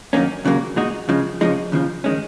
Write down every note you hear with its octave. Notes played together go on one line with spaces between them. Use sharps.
F#2 D#3 A#3 C#4
D#2 C#3 F#3 A#3
A#2 G#3 D#4 F#4
C#3 F3 G#3
F2 C#3 F3 G#3 D#4
D#2 C#3 F3
D#3 G#3 C#4